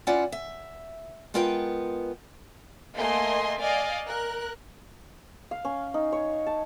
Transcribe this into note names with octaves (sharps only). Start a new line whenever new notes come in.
C#4 E4 F4 D5 F#5
E5
G#3 B3 F4 A#4 B4 G5
A3 A#3 D#5 G#5 C6
D5 D#5 F5 G#5
A#4 F#6
F5
C#4
D#4
C#5
A5